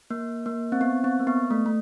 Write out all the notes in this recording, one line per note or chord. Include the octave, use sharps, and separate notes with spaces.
A#3
A#3
C4
B3
C4
A#3
B3
A3
A3